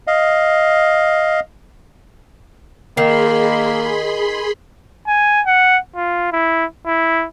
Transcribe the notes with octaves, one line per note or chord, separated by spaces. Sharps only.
D#5 F5
D#3 A#3 G#4 A#4 B5 C6 C7
G#5
F#5
F4
E4
E4